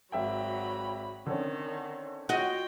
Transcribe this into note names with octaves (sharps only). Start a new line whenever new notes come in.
G#1 F#3 E5 G5 B5
D3 D#3 C4 C#4
F4 F#4 D#5 G5